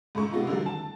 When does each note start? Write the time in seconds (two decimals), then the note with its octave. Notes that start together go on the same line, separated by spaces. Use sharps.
0.15 G#2 C#3 A3 C#6
0.31 C3 G#3 B3 D#4 F4
0.47 D3 D#3 F#3 G3 A3
0.66 A5